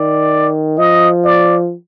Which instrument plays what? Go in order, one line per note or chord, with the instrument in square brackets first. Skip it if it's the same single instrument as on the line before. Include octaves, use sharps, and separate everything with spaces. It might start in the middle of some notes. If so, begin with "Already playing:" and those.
Already playing: [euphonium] D#3 [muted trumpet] D5
[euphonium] F3 [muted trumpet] D#5
[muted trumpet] D5